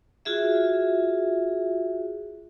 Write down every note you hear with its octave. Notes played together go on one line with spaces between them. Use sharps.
F4 F#4 G#4 E5